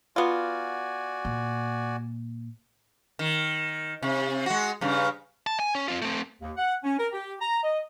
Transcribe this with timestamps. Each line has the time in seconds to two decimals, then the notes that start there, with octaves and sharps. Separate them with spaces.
0.16 B3 F4 F#4 D5 G#5
1.25 A#2
3.19 D#3
4.02 C3
4.46 G#3 F#4
4.81 G2 C#3
5.47 A5
5.60 G#5
5.75 C#4
5.88 C4 F4
6.02 A3 C4
6.41 D#2
6.57 F#5
6.83 C#4
6.98 A#4
7.12 G4
7.40 A#5
7.63 D#5